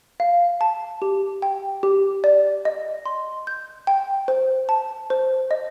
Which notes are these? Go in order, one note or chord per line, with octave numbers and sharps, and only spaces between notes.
F5
A5
G4
G5
G4
D5
D#5
C6
G6
G5
C5
A5
C5
D#5